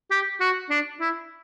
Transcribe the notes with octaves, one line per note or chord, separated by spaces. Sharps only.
G4
F#4
D4
E4